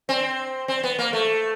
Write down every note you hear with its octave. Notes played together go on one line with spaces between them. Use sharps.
C4
C4
B3
A#3
A3